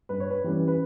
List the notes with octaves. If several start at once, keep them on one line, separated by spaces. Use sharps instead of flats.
G2 B4
C#5
B4
E3 G3 C#4
B4